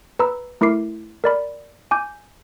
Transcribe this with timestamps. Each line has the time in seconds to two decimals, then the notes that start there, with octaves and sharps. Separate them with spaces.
0.19 B4 A#5 B5 E6
0.61 A3 E4 A#4 D6 C7
1.24 A#4 D5 B5
1.91 G#5 D6 G6